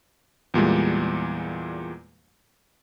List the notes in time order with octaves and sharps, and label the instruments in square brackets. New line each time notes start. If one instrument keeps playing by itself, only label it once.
[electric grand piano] E2 A#2 G3 G#3